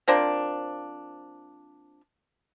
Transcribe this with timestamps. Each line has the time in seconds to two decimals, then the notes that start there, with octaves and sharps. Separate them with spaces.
0.08 F3 A#3 C4 D4